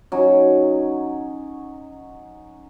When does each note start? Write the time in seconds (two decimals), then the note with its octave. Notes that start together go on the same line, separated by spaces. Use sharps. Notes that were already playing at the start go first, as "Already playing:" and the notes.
0.12 F#3 C#4 D#4